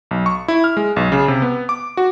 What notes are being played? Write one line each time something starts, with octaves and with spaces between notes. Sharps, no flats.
B1
C#6
E4
F6
G#3
B1
C#3
C3
B3
D6
F#4